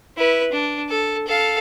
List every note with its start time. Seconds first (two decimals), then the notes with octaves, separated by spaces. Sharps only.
0.17 E4 B4
0.52 D4
0.89 A4
1.27 A4 F5